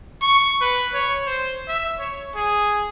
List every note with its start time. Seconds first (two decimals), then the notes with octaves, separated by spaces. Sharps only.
0.22 C#6
0.61 B4
0.94 C#5
1.26 C5
1.68 E5
1.99 C#5
2.35 G#4